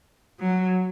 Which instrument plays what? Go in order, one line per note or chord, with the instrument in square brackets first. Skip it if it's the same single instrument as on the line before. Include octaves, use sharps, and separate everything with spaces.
[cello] F#3